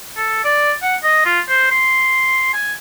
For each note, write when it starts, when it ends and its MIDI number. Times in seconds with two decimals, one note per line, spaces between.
0.17 0.43 69
0.44 0.72 74
0.82 0.96 78
1.04 1.24 75
1.25 1.40 65
1.49 1.71 72
1.71 2.53 84
2.53 2.73 80